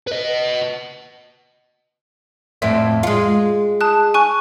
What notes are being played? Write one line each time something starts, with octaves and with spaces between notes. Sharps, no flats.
B4 D#5
F2 A2 C4 E5
G#3 F4
A5 D#6 F#6
G#5 C#6 F#6